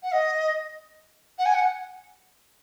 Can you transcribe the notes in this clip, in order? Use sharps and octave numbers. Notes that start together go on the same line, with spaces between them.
F#5
D#5
F#5
G#5
F#5